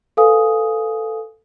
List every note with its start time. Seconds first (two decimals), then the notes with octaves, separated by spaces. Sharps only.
0.17 A4 B4 F5 G#5 D#6